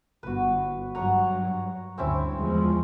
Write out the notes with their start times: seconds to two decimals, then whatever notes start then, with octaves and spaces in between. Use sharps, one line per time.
0.23 G1 F#4 B4
0.95 G2 F#3 C#5 F#5 A#5
1.98 D2 G2 C4 C#4 E4
2.40 E2 F3 G#3